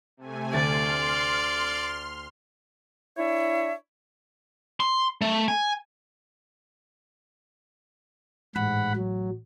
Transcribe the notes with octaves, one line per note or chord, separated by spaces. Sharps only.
C3 A3 G#5
D2 D5 C6 F6 A6
D4 E4 C#5 E5
C6
A3
G#5
A1 G#2 F#5 B5
F#3